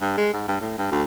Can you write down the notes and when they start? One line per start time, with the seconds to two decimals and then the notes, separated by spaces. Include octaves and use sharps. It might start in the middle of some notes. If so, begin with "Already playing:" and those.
0.01 G2
0.18 G#3
0.34 G#2
0.48 G2
0.61 A2
0.78 G2
0.92 D2